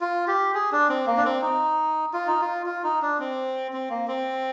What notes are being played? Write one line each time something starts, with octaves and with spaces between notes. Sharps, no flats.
F4
G4
G#4
D4
C4
A#3
D4
C4
D#4
F4
D#4
F4
F4
D#4
D4
C4
C4
A#3
C4